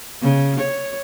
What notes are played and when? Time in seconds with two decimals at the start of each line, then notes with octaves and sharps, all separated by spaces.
0.22 C#3
0.60 C#5